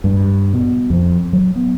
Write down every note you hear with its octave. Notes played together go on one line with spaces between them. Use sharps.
G2
B2
F2
F#3
B3